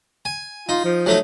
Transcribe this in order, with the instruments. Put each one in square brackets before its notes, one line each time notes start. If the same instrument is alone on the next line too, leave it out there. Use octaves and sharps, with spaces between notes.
[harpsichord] G#5
[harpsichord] D#4 [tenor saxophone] F4
[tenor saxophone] F3
[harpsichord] F#3 A3 D#4